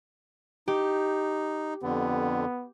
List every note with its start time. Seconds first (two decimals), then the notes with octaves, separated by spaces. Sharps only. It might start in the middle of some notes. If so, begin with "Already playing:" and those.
0.68 D#4 G4
1.83 F2 D3 B3